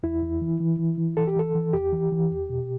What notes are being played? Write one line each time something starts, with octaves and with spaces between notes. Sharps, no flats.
E2 E4
E2
E3
E3
E3
E3
E3 A4
G4
E3 A4
E3
E2 G4
E3
E3
E2
B2